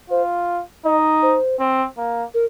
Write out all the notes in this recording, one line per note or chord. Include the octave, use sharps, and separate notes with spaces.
F4 C5
D#4 D#5
C5
C4
A#3
A#4